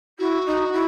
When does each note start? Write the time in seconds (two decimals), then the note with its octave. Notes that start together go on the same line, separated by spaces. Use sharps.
0.19 E4 F#4
0.45 D#4
0.73 E4